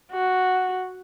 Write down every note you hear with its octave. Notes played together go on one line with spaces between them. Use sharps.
F#4